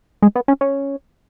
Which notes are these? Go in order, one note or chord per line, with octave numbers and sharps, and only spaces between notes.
G#3
B3
C#4
C#4